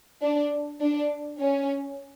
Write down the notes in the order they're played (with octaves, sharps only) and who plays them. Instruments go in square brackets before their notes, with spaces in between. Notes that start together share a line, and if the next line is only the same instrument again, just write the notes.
[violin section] D4
D4
C#4